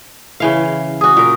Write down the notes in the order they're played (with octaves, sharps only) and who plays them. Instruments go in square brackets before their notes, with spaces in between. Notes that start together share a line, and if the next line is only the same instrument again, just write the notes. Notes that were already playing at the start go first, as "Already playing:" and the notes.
[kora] C#3 E3 F5
[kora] F#4 G#4 [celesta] D#6
[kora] A#2 A#4